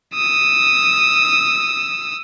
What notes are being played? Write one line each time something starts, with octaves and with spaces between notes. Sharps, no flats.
D#6 E6